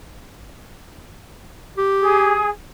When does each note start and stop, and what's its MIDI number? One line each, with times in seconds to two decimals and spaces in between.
1.78 2.41 67
2.01 2.46 68